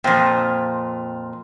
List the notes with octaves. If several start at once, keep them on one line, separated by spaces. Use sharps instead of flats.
F2 A#2 C4 A#5